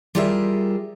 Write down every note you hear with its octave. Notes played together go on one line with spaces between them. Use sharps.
G3 F4 G4 G#4 A#4 E5